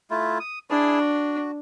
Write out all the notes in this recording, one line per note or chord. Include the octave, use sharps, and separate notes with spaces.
A3 E4 F4
D#6
D4 E4 G#4 A5
F#4